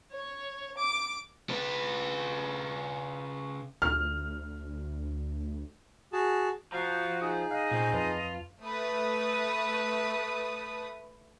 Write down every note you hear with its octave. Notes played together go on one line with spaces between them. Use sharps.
C#5
D6
C#3 B4
D2 F6
F#4 G#4 A5
F3 F#4 F5 A#5
D#4 G#4 D#6
D#5 F5 F#6
A#2 C4 C#4
F2 F4 B4 A5
A3 B4 D#6